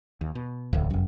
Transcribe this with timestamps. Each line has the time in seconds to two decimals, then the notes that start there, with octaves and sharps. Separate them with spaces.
0.21 D#2
0.35 B2
0.73 D1 G1 C2 F2
0.91 F1 F#2